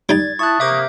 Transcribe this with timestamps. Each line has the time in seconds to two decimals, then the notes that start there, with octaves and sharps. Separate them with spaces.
0.09 G3 D#4 D5 G#6 A6
0.39 E4 A5 C#6 D#6 F#6
0.60 C3 A#3 E5 D6 G6